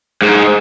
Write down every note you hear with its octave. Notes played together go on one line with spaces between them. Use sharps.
G#2